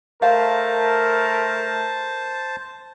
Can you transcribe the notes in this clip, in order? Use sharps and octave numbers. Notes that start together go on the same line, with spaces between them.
A3 A#4 C5 F5 A5